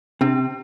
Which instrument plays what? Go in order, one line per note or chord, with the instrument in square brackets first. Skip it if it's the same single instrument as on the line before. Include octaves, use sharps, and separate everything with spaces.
[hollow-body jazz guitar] C3 [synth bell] D4